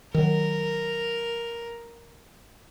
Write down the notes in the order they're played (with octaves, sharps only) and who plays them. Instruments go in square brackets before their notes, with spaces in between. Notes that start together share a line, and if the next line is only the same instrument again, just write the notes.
[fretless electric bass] D#3 F#3 [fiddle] A#4